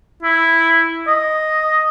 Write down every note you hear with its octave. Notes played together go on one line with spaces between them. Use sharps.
E4
D#5